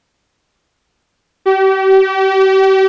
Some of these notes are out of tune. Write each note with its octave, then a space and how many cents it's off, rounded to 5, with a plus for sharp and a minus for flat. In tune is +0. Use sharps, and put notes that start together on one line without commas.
G4 -35